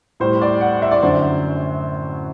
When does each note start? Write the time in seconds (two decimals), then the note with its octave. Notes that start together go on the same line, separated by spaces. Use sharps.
0.20 A2 G3 C5
0.42 D5
0.61 F#5
0.82 E5
0.91 D5
1.02 F#2 D3 F#3 C5